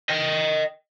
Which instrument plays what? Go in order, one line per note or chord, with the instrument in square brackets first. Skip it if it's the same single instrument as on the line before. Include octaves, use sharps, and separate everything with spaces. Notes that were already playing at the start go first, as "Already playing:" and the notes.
[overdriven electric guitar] D#5 G5